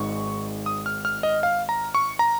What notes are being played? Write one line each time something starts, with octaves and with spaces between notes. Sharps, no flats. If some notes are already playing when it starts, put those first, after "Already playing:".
Already playing: G#1 G#2 G#3 C#6
D#6
F6
F6
D#5
F5
A#5
C#6
A#5